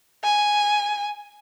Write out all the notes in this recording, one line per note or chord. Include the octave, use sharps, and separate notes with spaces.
G#5